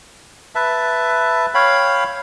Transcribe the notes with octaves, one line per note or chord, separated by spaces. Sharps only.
B4 E5 A5
C#5 F5 G5 B5